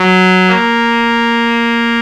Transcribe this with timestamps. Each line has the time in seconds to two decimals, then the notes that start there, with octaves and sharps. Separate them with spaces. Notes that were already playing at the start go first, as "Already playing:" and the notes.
Already playing: F#3
0.48 A#3